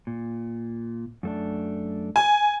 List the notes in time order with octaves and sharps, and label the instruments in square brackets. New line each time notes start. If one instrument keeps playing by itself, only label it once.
[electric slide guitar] A#2
F#2 A3 D4
[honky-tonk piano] G#5